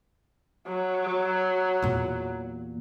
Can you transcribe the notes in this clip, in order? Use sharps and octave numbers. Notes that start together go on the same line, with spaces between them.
F#3
E2 A#2